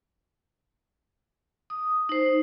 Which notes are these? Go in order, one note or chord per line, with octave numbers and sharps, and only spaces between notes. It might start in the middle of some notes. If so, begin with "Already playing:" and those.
D#6
D#4 C5